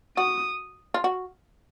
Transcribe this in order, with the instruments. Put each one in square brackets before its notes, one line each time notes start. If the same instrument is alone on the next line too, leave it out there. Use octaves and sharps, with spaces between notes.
[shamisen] F#4 [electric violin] D#6
[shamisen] F4
F#4